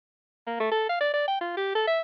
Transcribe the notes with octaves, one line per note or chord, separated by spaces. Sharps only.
A#3
A3
A4
F5
D5
D5
G5
F4
G4
A4
E5